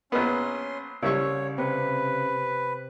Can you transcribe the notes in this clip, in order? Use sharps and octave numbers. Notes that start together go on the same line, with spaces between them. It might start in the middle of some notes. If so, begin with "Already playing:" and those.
A#1 B3 C#4 C6
C2 C#3 G3 C#5 E5 C#6
C3 B4